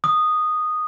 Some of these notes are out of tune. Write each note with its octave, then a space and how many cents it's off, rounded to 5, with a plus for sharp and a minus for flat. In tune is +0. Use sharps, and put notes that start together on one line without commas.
D#6 -10